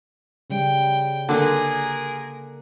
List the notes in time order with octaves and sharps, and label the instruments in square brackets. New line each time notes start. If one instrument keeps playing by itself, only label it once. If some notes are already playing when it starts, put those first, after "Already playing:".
[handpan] C#3 G3 [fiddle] G5
[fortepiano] D3 [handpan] A#3 [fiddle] G#4 A#4